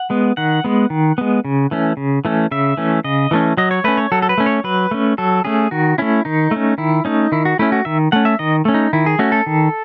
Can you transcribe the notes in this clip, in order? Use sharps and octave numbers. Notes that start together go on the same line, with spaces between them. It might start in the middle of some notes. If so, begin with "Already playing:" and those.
Already playing: F#5
G#3 B3
D#3 F#5
G#3 B3
D#3
G#3 B3
C#3
E3 A3 C#4
C#3
E3 A3 C#4
C#3 E5
E3 A3 C#4
C#3 D#5
E3 A3 C#4
F#3 D#5
C#5
A3 C#4 B4
C#5
F#3 A4
A4
B4
A3 C#4
C#5
F#3 B4
A3 C#4
F#3 A4
A3 C#4 G#4
D#3 F#4
A3 C#4 E4
D#3 D#4
A3 C#4
D#3 E4
A3 C#4 D#4
D#3 E4
F#4
A3 C#4 E4
F#4
D#3 E5
A3 C#4 F#5
E5
D#3 D#5
A3 C#4
D#4
D#3 E4
G#4
A3 C#4 F#4
A4
D#3